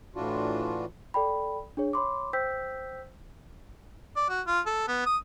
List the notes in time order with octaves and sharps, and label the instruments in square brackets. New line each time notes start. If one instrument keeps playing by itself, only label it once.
[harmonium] A2 E3 D4 F4 F#4
[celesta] A4 D5 G5 B5
D4 G#4 C#5
C#5 B5 C6 D6
C5 G5 E6 G6 B6
[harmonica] D5
F#4
F4
A4
B3
D#6